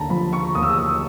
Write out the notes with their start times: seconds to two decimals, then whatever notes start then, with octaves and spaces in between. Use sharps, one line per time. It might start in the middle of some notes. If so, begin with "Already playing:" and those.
Already playing: D#2 D3 A5 A#5
0.09 F3 B5
0.33 C#6
0.55 D#2 D#6
0.63 E6
0.70 D#6
0.77 E6